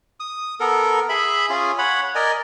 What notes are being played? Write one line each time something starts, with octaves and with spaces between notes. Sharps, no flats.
D#6
B3 A4 A#4
G#4 E5 B5
C#4 F4 G#4
C#5 F#5 B5
A#4 D5 D#5 G#5